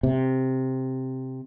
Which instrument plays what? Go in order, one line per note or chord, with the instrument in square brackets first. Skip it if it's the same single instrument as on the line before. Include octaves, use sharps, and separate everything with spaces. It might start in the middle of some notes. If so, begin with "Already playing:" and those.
[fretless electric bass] C3